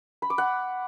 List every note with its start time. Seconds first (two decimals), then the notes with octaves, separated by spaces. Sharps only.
0.22 B5
0.30 D6
0.38 F#5